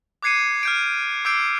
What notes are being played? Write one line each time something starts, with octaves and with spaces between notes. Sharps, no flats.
D6 F#6 G#6 C7 C#7 D#7
F6 G6 D7
D6 E6 G6 C7 D7